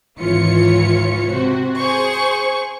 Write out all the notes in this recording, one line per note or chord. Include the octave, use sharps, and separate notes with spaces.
G#1 C#2 E3 F4 C#5 C#7
C3 F#4 C5
G#4 C5 C#6